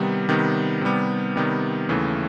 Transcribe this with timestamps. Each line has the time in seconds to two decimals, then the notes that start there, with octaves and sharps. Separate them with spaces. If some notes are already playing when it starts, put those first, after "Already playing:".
Already playing: C3 D#3 G3 B3
0.29 C3 D#3 G3 B3
0.81 C3 D#3 G3 B3
1.36 C3 D#3 G3 B3
1.89 D#2 C#3 E3 A3